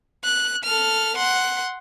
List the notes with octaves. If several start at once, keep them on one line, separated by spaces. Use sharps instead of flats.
F#6
A4 F6
F#5 C6